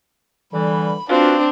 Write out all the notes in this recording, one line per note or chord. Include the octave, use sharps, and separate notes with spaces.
D3 E3 G3 B5
C4 D4 F4 F#4 B4